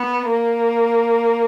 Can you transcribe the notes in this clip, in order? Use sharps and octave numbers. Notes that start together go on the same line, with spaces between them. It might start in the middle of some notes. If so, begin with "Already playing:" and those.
Already playing: B3
A#3